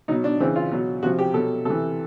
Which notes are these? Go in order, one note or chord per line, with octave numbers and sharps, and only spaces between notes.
B2 F#3 D#4
D4
C#3 E3 C4
F4
B2 F#3
C3 F3 F#4
G4
B2 F#3 A4
C3 E3 A4